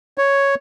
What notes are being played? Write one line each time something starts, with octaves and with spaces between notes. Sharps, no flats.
C#5